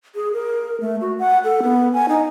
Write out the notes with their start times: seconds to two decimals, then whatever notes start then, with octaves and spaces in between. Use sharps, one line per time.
0.15 G#4
0.33 A#4
0.81 A3
1.01 F#4
1.19 F#5
1.44 A4
1.63 B3
1.93 G#5
2.09 D#4